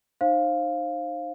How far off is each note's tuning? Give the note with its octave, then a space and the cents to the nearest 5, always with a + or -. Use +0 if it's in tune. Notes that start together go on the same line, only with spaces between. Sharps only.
D#4 -30 C5 +25 F5 +0